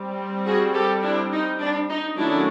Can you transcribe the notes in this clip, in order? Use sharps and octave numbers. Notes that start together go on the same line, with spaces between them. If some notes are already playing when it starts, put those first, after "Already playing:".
Already playing: G3 C4
F#4 G#4
G4 A4
D4 E4
D#4
D4
D#4
D#3 F#3 A3 C#4 D4 E4